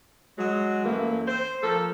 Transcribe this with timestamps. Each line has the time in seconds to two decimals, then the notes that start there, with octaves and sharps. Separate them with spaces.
0.38 F#3 G#3
0.85 F#2 E3 A3 A#3
1.27 C5
1.63 F3 A#3 A4